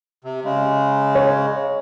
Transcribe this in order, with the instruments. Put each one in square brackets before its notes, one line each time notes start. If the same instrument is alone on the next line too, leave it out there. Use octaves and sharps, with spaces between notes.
[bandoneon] C3
C#3 G#3
[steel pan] C#5